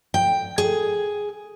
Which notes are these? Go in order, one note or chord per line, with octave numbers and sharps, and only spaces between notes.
G5
G#4